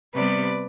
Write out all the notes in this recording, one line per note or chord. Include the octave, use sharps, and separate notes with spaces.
C3 G3 B3 B4 D5